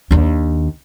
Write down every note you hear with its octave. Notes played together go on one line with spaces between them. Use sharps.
D#2 D4